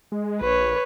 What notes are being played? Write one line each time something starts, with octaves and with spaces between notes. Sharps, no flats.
G#3
A#1 B4 C#5